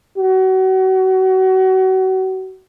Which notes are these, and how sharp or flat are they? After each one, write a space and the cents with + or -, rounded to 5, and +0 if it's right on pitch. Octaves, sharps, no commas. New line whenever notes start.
F#4 +30